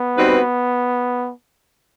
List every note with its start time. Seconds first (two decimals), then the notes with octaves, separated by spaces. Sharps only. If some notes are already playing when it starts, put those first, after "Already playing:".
Already playing: B3
0.17 G3 C4 D#4 F#4 B4